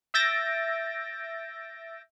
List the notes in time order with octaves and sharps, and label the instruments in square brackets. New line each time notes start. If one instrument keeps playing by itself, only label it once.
[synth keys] E5 E6 G6 A6 A#6 D7